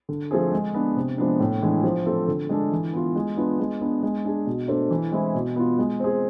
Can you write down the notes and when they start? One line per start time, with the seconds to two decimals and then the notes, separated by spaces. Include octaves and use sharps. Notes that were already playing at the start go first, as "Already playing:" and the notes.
0.09 D3
0.31 F3 A3 C4 G#4
0.53 G#3
0.74 B3 D4
0.96 C3
1.18 F3 G#3 B3 D4
1.40 A2
1.62 E3 G#3 D4
1.84 F3
2.06 A3 C4 F4 A4
2.28 D3
2.49 G#3 D4 A4
2.72 E3
2.93 B3 F4
3.15 G#3
3.37 B3 D4 F4 B4
3.60 G#3
3.81 B3 D4
4.03 G#3
4.25 D4 G#4
4.47 B2
4.68 A3 D4 A4 C5
4.90 E3
5.12 G#3 C4 E4
5.34 B2
5.56 B3 F4
5.78 G#3
6.00 C4 G#4